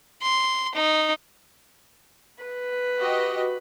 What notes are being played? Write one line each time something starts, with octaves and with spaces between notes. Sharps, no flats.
C6
D#4
B4
F#4 G4 D#5